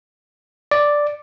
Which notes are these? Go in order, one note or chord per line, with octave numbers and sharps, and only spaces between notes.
D5